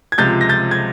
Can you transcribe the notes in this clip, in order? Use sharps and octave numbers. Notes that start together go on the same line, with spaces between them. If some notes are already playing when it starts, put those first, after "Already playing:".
G#6
C#2 C3 F3 G#3 G6 A6
A#6
G6 A6
G#6